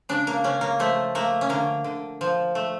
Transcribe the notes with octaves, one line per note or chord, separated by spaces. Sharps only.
C#3 D4
A#3
C#3 C#4
A#3
F3 A3
A3 A#3
C#4
D3 A#3
D3
F3
A3